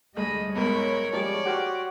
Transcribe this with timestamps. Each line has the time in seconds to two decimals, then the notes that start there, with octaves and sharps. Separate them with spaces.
0.16 D2 G3 G#3 D#5 B5
0.55 B1 G#2 B3 A#4 C#5 B5
1.13 F3 G3 G#3 D5
1.46 F#4 G4 C5 F6